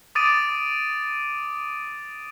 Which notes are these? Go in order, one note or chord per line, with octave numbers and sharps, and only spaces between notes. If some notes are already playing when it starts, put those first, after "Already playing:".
D6 D#6 A6 D7 D#7